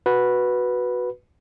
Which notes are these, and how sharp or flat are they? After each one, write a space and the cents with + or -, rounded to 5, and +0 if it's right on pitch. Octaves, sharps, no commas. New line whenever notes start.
F#4 -5 B4 -5